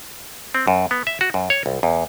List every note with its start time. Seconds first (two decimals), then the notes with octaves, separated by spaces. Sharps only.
0.55 C4
0.68 F#2
0.91 B3
1.07 E5
1.21 F#4
1.34 F#2
1.50 C#5
1.66 C2
1.83 E2